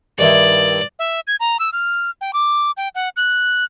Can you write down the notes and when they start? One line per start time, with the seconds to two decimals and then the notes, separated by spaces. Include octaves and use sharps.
0.19 G2 D#3 E4 D5
0.99 E5
1.27 G#6
1.40 A#5
1.60 E6
1.73 F6
2.21 G5
2.33 D6
2.77 G5
2.95 F#5
3.16 F#6